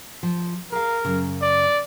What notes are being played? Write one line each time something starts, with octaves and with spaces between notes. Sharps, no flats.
F3
G#4 A#4 F5
F#2 C#3
D5